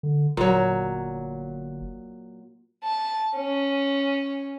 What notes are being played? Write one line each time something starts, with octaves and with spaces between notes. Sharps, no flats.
D3
G1 A#2 F#3
A5
C#4